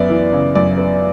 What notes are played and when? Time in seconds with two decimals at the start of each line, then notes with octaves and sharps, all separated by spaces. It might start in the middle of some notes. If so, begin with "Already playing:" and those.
Already playing: F#2 B3 D5 E5
0.10 E3
0.33 C#3
0.55 F#2 D5
0.78 B3